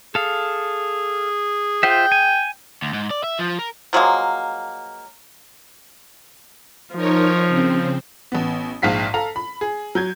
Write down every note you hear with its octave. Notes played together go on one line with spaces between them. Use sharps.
G#4 A4 F5
F4 C5 E5 G5
G#5
D2
G#2
D5
E5
F3
A#4
F3 F#3 G#3 A#3
F3 D#4 A#4 C#5
C#3 C4
A1 B3
A#1 G#2 F5 B6 C7
A4 F5 A#5
B5
G#4
F#3 G6 G#6